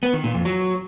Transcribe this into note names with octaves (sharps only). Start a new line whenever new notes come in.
B3
D#3
A#2
F2
F#3